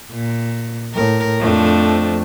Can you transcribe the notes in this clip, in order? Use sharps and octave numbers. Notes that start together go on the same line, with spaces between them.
A#2
A2 A#4
F2 F3 A3 D4